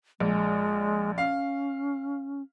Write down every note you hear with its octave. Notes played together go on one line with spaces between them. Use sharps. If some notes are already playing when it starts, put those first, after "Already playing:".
A#1 G#3
C#4 F5